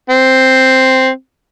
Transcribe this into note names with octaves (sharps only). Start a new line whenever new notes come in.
C4